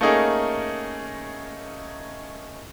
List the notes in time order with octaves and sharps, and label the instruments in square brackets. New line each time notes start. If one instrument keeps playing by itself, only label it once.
[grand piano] A3 A#3 C#4 D#4 G#4 A#4